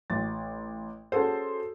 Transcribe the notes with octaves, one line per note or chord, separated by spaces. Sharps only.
A1 A6
C#4 F#4 G#4 A4 C5